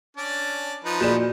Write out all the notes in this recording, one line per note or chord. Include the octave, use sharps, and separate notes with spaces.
C#4 D4 D5
F3 D#4 B4
A#2 F#4 G#4 D5 E7